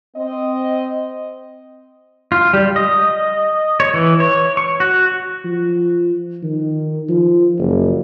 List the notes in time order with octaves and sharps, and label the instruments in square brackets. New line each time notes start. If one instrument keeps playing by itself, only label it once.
[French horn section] C4 D#5
[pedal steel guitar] F4
G3
D#5
C#5
E3
C#5
C#6
F#4
[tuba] F3
D#3
F3
F#1